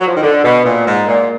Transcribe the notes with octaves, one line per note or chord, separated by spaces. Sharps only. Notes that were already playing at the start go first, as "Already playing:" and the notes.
F#3
F3
D#3
D3
B2
A#2
G#2
A#2